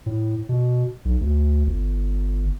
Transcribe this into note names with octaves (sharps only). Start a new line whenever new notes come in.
A2
B2
B1
D2
G1